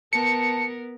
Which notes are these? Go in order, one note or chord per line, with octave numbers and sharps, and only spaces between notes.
B3 A#4 A5 C#7